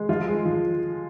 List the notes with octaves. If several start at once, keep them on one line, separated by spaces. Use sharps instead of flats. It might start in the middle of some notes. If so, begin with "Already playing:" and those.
Already playing: G#3
F3 F4
G#3
F3